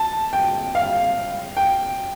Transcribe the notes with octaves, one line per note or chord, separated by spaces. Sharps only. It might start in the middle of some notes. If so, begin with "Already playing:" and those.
Already playing: A5
G5
F5
G5